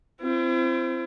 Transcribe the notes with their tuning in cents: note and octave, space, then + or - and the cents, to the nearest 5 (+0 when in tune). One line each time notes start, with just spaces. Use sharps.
C4 +0 E4 +45